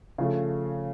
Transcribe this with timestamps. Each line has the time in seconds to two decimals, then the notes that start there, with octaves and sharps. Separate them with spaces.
0.18 C#3 F3 A3